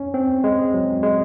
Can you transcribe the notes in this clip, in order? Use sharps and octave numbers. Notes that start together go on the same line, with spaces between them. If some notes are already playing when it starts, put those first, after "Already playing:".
Already playing: C#4
C4
G#3
F#3
G#3